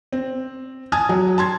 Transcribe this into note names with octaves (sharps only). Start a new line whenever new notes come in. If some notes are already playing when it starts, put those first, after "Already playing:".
C4
G#5 A5 D#6 G#6
F#3
A5 C6 G#6